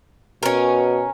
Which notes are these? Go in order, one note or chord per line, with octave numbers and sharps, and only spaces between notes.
B2 C#4 A#4